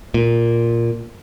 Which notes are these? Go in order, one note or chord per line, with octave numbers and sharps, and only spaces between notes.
A#2